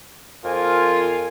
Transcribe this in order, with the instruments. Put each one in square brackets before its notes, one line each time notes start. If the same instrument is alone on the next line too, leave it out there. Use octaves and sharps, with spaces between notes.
[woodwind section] F2 A#4 G#5 [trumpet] F4